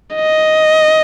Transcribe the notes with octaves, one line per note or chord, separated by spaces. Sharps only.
D#5